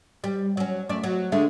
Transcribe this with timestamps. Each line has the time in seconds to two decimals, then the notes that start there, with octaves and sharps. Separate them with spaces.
0.24 G3
0.57 F#3 C#4
0.89 F#2 A3 D5
1.03 F#3
1.32 D3 G#3 A3